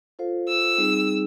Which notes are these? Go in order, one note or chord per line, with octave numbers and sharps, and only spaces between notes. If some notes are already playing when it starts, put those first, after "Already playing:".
F4 A4 C5 F5
E6
G3 C4 D#4 G#4